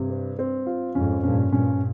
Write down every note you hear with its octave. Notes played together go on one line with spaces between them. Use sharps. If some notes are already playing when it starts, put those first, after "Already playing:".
Already playing: G2 C3
C4
C4
F4
F2 G#2 C#4
G2 A#2 C#4
G2 A#2 C#4